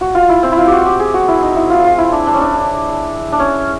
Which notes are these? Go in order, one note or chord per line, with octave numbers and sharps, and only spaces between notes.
F#4
F4
E4
C4
E4
F4
F#4 G4
G4
G#4
F#4
E4
D#4
E4
F4
F4
E4
D4
D4
C#4
D4
D4
C#4